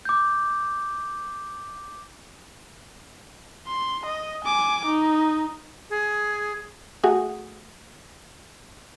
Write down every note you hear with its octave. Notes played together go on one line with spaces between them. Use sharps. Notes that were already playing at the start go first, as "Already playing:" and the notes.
D6 G6
C6
D#5
G#5 D6
D#4
G#4
A3 F#4 G#4